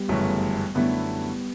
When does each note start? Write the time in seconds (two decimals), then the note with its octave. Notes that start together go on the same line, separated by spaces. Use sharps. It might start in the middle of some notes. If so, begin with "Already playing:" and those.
Already playing: G3 B3
0.09 G1 F#2 C#3 E3 A3
0.74 F#2 D3 G3 A3 B3 E4